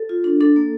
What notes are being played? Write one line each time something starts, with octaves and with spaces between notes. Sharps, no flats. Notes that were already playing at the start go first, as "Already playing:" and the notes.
Already playing: A4
F4
D4
D4 A4
A#3